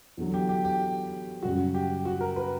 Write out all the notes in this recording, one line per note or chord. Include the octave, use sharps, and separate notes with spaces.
E2 D3 F#3
G4
G4
G4
F#2 C#3 G3 F#4
G4
F#4
A#4
B4